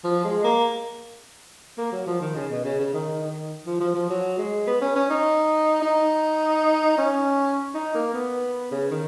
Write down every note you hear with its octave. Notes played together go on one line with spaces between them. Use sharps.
F3
G#3
A#3
A#3
F#3
F3
D#3
C#3
B2
C#3
C#3
D#3
D#3
F3
F3
F3
F#3
G#3
B3
C#4
C#4
D#4
D#4
C#4
D#4
A#3
B3
C#3
D#3